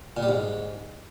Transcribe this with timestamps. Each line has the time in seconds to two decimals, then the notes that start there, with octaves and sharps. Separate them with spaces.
0.17 A#2
0.23 G3
0.29 G#2